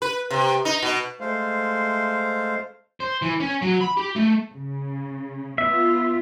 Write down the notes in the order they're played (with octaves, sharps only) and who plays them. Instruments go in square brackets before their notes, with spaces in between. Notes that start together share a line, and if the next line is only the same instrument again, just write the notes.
[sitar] B4
C3
D#4
B2
[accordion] G#3 A3 C5 F5
[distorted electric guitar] C5
E3
C#4
F#3
B5
G4
A3
[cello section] C#3
[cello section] B3 F4 [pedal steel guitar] E5